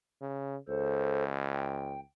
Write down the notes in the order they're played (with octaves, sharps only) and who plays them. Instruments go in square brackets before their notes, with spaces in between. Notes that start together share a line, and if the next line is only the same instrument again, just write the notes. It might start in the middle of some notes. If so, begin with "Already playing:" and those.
[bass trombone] C#3
[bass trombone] C#2 [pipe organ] A4 C5
[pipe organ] G5